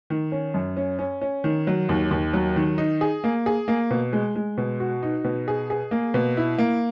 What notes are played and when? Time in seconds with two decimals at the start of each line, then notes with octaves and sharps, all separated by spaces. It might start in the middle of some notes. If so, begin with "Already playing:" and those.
0.10 D#3
0.32 C#4
0.54 F#2
0.77 C#4
0.99 C#4
1.21 C#4
1.44 D#3
1.67 F#3
1.89 D#2
2.11 D#2
2.33 F#3
2.56 D#3
2.78 D#4
3.01 G#4
3.24 A#3
3.46 G#4
3.68 A#3
3.91 B2
4.13 G#3
4.35 G#3
4.58 B2
4.80 F#4
5.03 D#4
5.24 B2
5.48 G#4
5.70 G#4
5.91 A#3
6.14 B2
6.37 E4
6.58 A#3